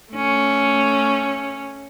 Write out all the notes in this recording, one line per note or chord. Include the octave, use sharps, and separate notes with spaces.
A3 C#4